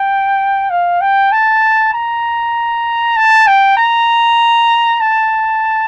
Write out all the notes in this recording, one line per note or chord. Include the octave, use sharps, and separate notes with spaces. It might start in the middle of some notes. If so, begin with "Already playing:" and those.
Already playing: G5
F5
G5
A5
A#5
A5
G5
A#5
A5